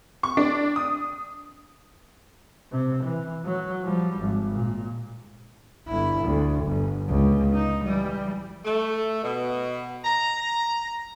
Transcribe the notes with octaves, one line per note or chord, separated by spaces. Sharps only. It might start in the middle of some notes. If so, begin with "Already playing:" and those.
C#6
D4
D#6
C3 C4
E3
F#3
F3 G3
G#1
A#2
G1 E4
D2
G1
C#2
D#4
E3 G3
A3
B2
A#5